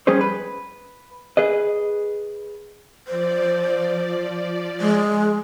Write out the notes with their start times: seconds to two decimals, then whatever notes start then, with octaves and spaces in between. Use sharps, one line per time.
0.07 F2 G3 C#4 G#4 B4 C5
0.21 B4
1.37 G#4 B4 D#5
3.07 F3 C5 D5
4.80 G#3